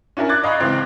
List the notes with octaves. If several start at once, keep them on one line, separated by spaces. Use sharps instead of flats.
C#4 D4 E4 A#4
D6 F#6 G#6 A6
D#5 F5 A#5 B5 C#6
C#2 E3 C4